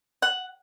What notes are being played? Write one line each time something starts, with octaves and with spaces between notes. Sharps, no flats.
F#5